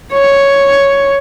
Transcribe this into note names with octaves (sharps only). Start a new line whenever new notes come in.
C#5